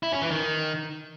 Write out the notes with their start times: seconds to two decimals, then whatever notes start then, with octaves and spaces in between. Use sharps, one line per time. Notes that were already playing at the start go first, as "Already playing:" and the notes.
0.03 E4
0.12 C#4
0.22 E3
0.31 D#3